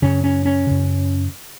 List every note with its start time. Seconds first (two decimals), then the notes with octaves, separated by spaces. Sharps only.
0.02 F#2 C#3 C#4
0.24 C#4
0.45 C#4
0.67 F#2 C#3